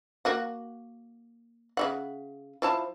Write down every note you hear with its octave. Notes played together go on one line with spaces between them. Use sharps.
A#3 F#4 F#5
C#3 E5 F#5
F3 E4 A5